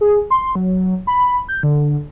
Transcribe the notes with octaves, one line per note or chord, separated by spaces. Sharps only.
G#4
C6
F#3
B5
G6
D3